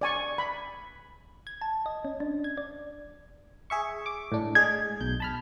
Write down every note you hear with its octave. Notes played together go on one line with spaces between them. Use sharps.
D5 G#5 C#6
B5
G#6
A5
D#5
C#4
D4
G#6
D5
G#4 E5 C#6
D6
A2 D4
G#3 G#4 G#6
B1 G6
A5 B5 F6